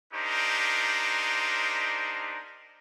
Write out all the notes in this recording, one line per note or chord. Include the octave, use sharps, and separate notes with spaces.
B3 D4 D#4 G4 A#4 C5